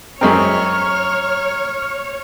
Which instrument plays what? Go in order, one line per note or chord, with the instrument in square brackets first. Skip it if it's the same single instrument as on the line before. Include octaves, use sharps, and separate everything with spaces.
[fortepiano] F#2 G#3 C4 [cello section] C#5 [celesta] A#5 C#6 [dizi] F6